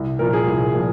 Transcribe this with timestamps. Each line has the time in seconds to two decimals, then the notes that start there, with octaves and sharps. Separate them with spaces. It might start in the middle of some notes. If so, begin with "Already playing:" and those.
Already playing: C2
0.19 A#2 F3 A#4
0.33 G#4
0.47 C2
0.74 A#2 F3